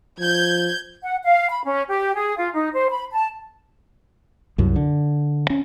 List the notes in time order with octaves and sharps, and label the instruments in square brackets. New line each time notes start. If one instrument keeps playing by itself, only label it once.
[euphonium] F3 [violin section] G6 G#6
[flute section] F#5
F5
B5
C#4
G4
G#4
F4
D#4
C5
B5
A5
[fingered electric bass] C2 F#2
D3
C#4